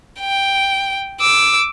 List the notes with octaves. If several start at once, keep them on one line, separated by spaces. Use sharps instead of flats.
G5
D6 E6